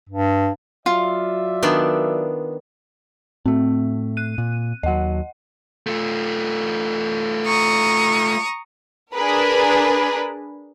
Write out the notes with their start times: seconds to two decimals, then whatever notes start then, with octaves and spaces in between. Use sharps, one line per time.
0.09 G2
0.86 F#3 F4 D5 E5
1.63 D#3 B3 D4
3.46 A2 A3 C4
4.17 F#6 D#7
4.38 A#2
4.83 D#2 F#3 D#5 F#5
5.87 A3 F4
7.46 A#5 C#6 D#6
9.13 D4 G#4 A#4 B4